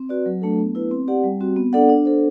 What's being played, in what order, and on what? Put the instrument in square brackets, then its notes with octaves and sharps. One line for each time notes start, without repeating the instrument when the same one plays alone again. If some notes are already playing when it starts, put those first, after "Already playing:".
Already playing: [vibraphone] C4
F#4 B4 D5
F#3
A3 D4 A4
B3
E4 B4
C4
G4 D5 F#5
G3
C4 F#4
B3
D4 A4 D5 F#5
D4
A4 C5